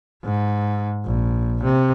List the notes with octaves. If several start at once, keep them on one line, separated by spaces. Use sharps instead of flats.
G#2
A#1
C3